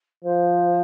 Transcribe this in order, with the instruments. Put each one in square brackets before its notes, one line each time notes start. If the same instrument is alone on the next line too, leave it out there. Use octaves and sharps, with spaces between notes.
[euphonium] F3 [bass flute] C5